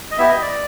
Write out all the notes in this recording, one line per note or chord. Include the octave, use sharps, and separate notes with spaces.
D#5
B3 E4 G4 E5
D#5
D5